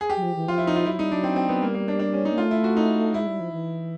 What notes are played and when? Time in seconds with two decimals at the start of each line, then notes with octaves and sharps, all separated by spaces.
0.01 G#4
0.10 G4
0.17 F#3
0.23 F3
0.36 E3
0.48 F3 F4
0.58 E4
0.67 D#4
0.76 F4
0.86 F#3 E4
0.99 G3 D#4
1.11 F#3 D4
1.23 C4
1.36 C4
1.49 B3
1.62 G3 A#3
1.74 A#3
1.88 D4
1.99 D4
2.13 C#4
2.25 D#4
2.32 A#3
2.38 A3 F4
2.51 E4
2.64 F#4
2.77 D#4
3.14 G#3 E4
3.26 G3
3.40 F3
3.52 E3